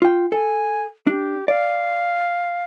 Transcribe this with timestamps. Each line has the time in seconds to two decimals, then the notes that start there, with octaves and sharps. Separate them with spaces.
0.02 F4 G5
0.32 A4 G#5
1.07 D4 G4
1.48 D5 F5